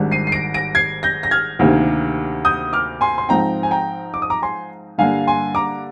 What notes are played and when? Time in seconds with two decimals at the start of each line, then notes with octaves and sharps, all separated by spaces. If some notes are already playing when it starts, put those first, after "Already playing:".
Already playing: G#1 G#2 G3 D4
0.12 C7 D#7
0.27 C7
0.32 A#6 D7
0.54 A#6 D7
0.75 G#6 C7
1.03 G6 A#6
1.23 A#6
1.31 F6 G#6
1.59 D2 C3 D#3 A#3
2.45 D#6 G6
2.73 D6 F6
3.01 G#5 C6
3.18 C6
3.29 G#2 F3 C4 D#4 G5 A#5
3.63 G#5
3.71 G5 A#5
4.14 D6
4.22 D#6
4.30 A#5 D6
4.42 G#5 C6
4.98 G2 D3 G3 A#3 D4 F5 G#5
5.27 G#5 C6
5.55 A#5 D6